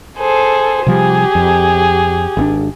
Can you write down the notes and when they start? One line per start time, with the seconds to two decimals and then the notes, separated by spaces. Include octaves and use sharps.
0.17 G#4 A4 C5
0.86 C3 F3 G3 G4 G#4
1.35 F2
2.37 G#1 C#3 D4